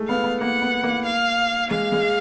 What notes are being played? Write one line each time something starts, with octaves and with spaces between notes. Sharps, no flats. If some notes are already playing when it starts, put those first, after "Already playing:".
Already playing: G#3 A3
B3 F5
B3
A#3 F#5
B3
A#3
F5
G#3 F5
G#3